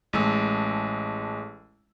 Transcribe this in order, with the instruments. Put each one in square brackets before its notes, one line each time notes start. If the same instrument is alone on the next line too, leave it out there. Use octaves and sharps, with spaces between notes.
[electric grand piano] A1 G#3 A3 E6